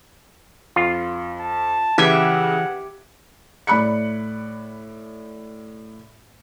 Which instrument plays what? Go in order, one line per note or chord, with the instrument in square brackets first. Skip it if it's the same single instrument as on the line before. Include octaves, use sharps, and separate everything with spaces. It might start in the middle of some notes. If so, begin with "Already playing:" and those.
[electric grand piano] F2 [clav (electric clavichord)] F4
[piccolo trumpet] A5
[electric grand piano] C#3 G#6 [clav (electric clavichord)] E3 [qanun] G4 E5 [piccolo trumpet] F#5
[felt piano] A2 D5 B5 F#6 C#7